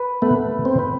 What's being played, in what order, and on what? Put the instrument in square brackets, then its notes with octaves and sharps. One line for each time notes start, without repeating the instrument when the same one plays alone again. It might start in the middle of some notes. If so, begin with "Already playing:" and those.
Already playing: [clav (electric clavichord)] B4
[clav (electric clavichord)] A3 [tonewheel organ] B3
[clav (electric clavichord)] B4
[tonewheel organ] C4
[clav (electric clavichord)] B4